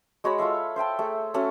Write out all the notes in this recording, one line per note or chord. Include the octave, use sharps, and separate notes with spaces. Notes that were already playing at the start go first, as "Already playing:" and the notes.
G#3 F#4 C#5 B5
F4 A4 E5 F5
C5 E5 G5 A5
A3 G#4
A3 C#4 F#4